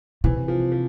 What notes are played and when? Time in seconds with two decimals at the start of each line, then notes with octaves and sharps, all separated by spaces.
0.24 C3 E3
0.48 F3
0.72 F3